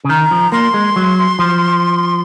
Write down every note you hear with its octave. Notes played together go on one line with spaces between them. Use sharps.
C#3
D#3 A#5
F3
A#3 C6
G#3
F#3
F3